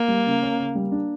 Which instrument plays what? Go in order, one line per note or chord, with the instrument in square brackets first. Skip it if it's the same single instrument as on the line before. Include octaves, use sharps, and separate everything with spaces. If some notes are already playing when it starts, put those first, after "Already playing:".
Already playing: [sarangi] A#3
[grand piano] G3
C#3
C#4
C#3
G3
D4